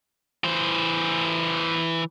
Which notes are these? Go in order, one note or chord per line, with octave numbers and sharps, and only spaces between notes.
E3 C5